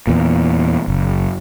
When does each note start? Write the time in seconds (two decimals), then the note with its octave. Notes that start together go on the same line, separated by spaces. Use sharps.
0.07 E2 A#2
0.88 F#1